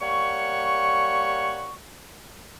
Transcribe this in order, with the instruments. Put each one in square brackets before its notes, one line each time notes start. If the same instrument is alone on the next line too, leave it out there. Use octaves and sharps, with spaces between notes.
[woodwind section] G3 A#3 C#5 F#5 C#6